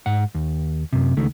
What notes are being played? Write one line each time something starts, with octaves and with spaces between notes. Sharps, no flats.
G#2 F#5
D#2
F#2 C3
C#2 D#3 A3